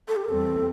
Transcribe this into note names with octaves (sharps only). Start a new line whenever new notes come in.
A4
G4
A#4
E2 E3 G3 C4 A4